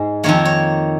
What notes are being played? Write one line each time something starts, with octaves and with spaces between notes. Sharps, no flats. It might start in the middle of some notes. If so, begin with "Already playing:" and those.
Already playing: G#2 G#3
F2 D#3 A#3 C#5
C#5